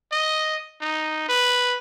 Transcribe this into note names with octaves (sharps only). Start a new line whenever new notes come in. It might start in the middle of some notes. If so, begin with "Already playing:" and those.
D#5
D#4
B4